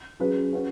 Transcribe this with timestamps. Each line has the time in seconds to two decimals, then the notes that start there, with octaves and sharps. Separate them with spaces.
0.20 F#3 C#4 G#4 B4
0.53 C#4 F#4 B4